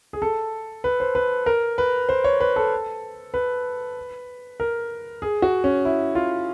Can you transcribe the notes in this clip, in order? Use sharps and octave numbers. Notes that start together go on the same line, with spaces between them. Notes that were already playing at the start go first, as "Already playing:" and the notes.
G#4
A4
B4
C5
B4
A#4
B4
C5
C#5
B4
A4
B4
A#4
G#4
F#4
C#4
E4
F4